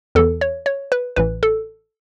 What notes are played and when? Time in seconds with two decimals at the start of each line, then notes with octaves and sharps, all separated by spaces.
0.15 E2 E3 A4
0.41 C#5
0.66 C#5
0.92 B4
1.16 A1 A2 E3 B4
1.43 A4